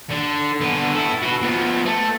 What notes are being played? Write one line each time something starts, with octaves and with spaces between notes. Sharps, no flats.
D3
D3 B3
E4 A4
F#4 B4
F3 B3
A3